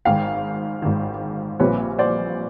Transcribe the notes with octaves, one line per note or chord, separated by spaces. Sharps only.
G#1 G#2 D#3 F5 G5
G#1 G#2 D#3
A#1 A#2 G3 C4 B4 C#5
C5 D5